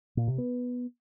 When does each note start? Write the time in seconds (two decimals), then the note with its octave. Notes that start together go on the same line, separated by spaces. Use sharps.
0.17 A#2
0.28 C3
0.38 B3